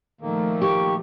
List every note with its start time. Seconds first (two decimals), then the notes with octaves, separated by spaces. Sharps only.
0.21 A#2 D#3 F3 A3 A#3
0.62 G4 C#6